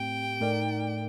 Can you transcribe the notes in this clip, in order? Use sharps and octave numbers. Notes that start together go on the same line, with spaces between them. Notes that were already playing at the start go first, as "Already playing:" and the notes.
Already playing: A2 A3 C4 G4 G5
A2 A3 D#4 A#4 D5